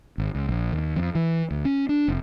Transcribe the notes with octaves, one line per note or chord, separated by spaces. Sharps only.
G#1
C#2
A#1
D#2
F2
E3
D2
C#4
D4
F1